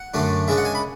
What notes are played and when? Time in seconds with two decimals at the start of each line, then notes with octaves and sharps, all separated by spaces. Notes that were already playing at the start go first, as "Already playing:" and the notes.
Already playing: F#5
0.14 F#2 D3 A3 D4
0.48 C#3 G#3 D4 E5
0.57 F#5
0.65 G#5
0.75 B5